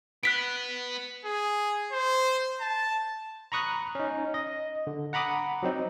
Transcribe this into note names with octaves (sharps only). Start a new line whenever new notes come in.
B3 F#6 B6 D7
G#4
C5
A5
A#5 B5 C#6 D#6 F#6
C#4 D#4
D#5
D3
F#5 A#5 B5 D6 D#6
F#3 C4 D#4